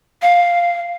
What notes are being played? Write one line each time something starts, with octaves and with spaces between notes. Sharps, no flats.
F5